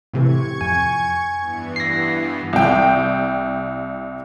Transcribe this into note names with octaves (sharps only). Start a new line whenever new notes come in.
A2 C3 E3 C#6 G#6
F2 G#5
G2 E3 B3
A#6 C7
C2 G5